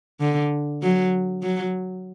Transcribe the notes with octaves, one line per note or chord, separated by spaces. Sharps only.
D3
F#3
F#3